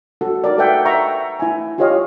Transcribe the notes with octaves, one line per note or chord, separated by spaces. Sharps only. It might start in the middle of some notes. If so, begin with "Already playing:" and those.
F#4 A4 F#5
D#4 A#4 D5
A4 B4 E5 F#5 G5
E5 F#5 G5 A#5 C#6
E4 G#5
F4 G4 C5 C#5 D#5 F5